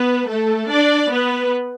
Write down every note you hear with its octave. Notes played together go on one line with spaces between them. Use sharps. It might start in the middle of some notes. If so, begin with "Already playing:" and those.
Already playing: B3 B4
A3 A4
D4 D5
B3 B4